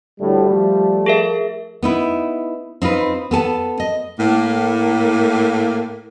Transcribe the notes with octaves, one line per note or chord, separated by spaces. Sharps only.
D2 A2 G3
F3 A3
G#4 A#4 E5
B3 D#4 E4
C4 D#4 F4 B4
B3 A4 G#5 A5
D#5
A2 A#3